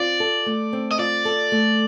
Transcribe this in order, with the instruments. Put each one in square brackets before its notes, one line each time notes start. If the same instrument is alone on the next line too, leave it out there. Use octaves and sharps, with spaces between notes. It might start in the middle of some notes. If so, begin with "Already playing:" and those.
Already playing: [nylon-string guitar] C4 F4 [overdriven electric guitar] D5
[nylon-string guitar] A4
A3
C4
[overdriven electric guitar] D#5
[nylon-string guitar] F4 [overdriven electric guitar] D5
[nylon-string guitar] A4
A3